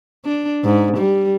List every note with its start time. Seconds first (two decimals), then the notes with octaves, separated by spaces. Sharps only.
0.25 D4
0.64 G#2
0.97 G3